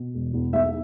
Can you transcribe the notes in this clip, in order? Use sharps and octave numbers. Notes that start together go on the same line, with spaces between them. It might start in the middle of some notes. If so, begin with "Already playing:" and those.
Already playing: B2
E1
E2
B1 E5